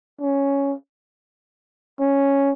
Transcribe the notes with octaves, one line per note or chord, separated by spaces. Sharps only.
C#4
C#4